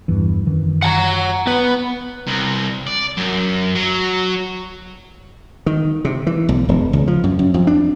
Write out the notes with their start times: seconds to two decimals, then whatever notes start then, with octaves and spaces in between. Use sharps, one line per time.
0.08 E2 G2 E3
0.47 F#2 D#3 E3
0.82 F#5 A5 A#5
1.47 B3 B4
2.27 C2
2.87 D5
3.17 F#2
3.75 F#3
5.66 D#3
6.05 C3
6.27 E3
6.49 B1
6.69 E1
6.93 C#2
7.07 F3
7.24 F#2
7.39 F#2
7.54 F2
7.67 D4